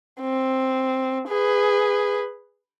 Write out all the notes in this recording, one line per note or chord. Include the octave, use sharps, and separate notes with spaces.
C4
G#4 B4